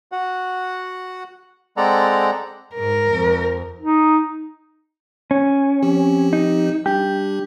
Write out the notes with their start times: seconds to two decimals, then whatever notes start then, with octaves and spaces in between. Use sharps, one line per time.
0.12 F#4 F#5
1.77 G#3 C4 A4 D5 F#5 A#5
2.76 G#2 A#4
3.08 F2
3.81 D#4
5.31 C#4
5.83 F3 C4 G4
6.33 D#4
6.86 G3 D4 G4